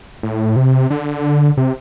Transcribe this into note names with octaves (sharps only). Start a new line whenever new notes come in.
A2
C3
D3
C3